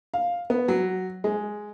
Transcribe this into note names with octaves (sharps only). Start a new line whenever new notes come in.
F5
B3
F#3
G#3